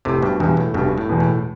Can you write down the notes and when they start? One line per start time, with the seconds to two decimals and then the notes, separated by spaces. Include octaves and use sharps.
0.05 F1 A2 C3
0.22 G2 B2
0.40 E2 G2 B2
0.57 A2
0.74 F1 G2 B2
0.98 A2
1.09 E2 B2
1.20 A2